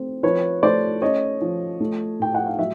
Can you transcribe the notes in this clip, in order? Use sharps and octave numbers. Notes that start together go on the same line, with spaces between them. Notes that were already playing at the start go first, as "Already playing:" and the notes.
Already playing: A3 C4
F3 B4 C#5
A3 C5 D5
C#4 C#5 D#5
F3
A3
A2 G5
F#5
F5
F#3 E5